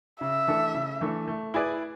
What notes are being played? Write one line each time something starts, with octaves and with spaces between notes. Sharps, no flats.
C#3 E5
E3 A3 D4 A4
C#3
E3 A3 D4 A4
A3
E4 G#4 B4 D5